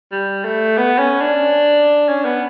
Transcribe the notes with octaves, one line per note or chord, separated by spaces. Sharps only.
G3
A3
B3
C#4
D4
C#4
B3